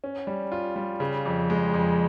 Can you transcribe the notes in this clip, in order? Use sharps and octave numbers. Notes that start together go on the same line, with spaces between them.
C#4
G3
F4
G3
C#3
F2
G#3
F2